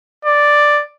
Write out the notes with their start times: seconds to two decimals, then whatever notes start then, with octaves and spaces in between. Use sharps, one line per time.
0.25 D5